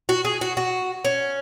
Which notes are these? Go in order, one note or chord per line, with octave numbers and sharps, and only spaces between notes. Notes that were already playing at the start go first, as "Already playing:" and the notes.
F#4
G#4
F#4
F#4
C#4